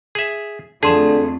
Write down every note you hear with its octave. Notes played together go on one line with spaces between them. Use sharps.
G#4 E5
F2 D3 A3 G#4 A5 C6 E7